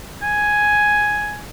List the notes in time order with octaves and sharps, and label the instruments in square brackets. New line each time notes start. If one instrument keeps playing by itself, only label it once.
[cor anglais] G#5